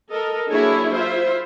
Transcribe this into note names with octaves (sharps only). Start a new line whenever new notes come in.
A4 A#4 D#5
F#3 A#3 D4 E4 G#4 C#5
E4 F4 C5 E5